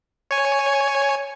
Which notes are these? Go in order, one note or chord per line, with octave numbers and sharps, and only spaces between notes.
C#5 G#5